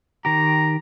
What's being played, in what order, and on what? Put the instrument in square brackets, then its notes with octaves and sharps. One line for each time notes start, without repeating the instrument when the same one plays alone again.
[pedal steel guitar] D#3 G4 [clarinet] A#5